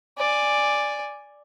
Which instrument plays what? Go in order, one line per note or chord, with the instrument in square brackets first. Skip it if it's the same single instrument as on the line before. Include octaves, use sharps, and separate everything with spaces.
[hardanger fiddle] D5 G#5